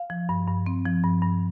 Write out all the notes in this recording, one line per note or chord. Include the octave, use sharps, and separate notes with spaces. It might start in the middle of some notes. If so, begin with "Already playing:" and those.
Already playing: F5
F3
G2
G2
C4
F3
G2
G2